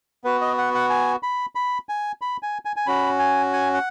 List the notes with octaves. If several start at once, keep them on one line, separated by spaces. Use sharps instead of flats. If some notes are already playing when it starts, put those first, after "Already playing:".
B3 F#4 B4
D#5
F#5
F#5
G#5
B5
B5
G#5
B5
G#5
G#5
G#5
C#4 F#4 B5
G#5
G#5
F#5